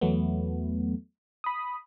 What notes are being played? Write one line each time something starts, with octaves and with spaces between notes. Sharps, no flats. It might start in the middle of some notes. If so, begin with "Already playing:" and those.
E2 F#3 A3 B3
B5 D#6